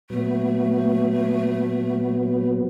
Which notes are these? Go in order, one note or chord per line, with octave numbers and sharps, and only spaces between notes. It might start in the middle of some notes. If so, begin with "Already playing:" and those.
A#2 F#3 A3 B3